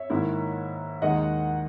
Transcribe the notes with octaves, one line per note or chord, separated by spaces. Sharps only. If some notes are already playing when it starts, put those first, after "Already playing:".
Already playing: C#5 E5
G#2 D#3 A#3 E4
D#2 D#3 G#3 D#4 D#5 F#5